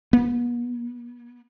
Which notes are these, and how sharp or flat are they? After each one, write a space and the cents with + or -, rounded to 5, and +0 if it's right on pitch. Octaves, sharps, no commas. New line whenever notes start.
B3 -40